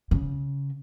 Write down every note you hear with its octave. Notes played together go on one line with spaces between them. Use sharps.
C#3